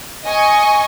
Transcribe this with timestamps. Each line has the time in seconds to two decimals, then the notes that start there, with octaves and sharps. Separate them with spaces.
0.24 D#5 G#5 C#6 D#6